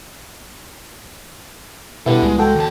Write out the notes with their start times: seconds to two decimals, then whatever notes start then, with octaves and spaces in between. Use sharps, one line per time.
2.06 B2 G3 B3 E4 A4 D5
2.23 C#2 G#3
2.38 G#3 F#4 A4 G5
2.56 D#2 A5